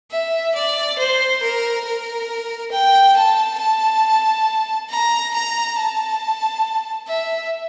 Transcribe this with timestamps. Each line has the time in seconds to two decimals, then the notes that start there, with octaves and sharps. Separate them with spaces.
0.11 E5
0.55 D5
0.99 C5
1.43 A#4
1.86 A#4
2.72 G5
3.17 A5
3.59 A5
4.89 A#5
5.34 A#5
5.76 A5
7.07 E5